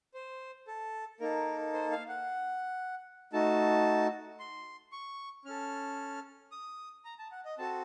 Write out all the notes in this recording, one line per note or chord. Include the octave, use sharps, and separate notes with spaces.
C5
A4
A#3 D#4 A4 A#4
C5
F5
F#5
A3 D#4 F#4 A5
C6
C#6
C#4 A4 F6
D#6
A#5
A5
F#5
D#5
C4 F#4 A4 A5